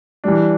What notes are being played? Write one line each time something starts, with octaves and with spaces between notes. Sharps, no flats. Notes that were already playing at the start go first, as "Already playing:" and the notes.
E3 G3 D4